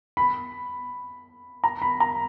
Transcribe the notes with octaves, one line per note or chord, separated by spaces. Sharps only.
B5
A#5
B5
A#5